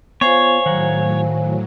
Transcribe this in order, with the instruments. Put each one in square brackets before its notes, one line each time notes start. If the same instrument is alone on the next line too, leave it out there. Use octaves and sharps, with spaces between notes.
[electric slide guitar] B3 F4 [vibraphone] C5 F5 G#5 [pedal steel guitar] C#5
[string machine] A2 F#3 [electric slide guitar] D#3 F#5 A#5